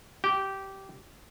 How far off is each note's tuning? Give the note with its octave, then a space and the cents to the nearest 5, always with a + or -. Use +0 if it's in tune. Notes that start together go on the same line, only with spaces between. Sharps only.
G4 -15